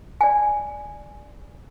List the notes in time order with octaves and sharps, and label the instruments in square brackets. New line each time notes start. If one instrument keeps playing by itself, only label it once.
[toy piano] D5 G#5